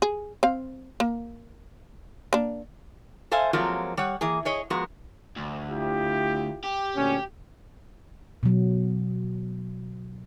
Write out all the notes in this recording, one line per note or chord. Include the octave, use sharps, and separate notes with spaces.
G#4
C4 F5
A#3
A#3 D4
A4 C5 E5 F5 G#5
F3 F#3 G#3 A#3 C4 F4
G3 C#5 F#5
E3 A#3 G#4
G#4 C#5 D#5
F3 G#3 B3 F#4 A#4
D2
E4 F4 G4
G4
D2 A#2 C#4
B2 F#3